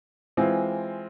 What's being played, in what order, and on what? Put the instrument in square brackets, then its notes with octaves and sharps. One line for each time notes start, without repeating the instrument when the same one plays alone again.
[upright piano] E3 G#3 C4 F4